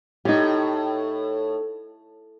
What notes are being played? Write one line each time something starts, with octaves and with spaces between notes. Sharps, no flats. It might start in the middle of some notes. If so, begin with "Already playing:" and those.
A2 D#4 G4